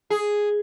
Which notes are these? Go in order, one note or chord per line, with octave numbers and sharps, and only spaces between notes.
G#4